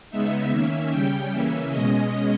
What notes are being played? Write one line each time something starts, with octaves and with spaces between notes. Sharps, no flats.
C#3 G#3 B3 D#4 E5
D#3 A#3 C#4
C#3 G3 C#4 G5
C#3 E3 A#3 C#4 E5
B2 G#3 C#4 D#5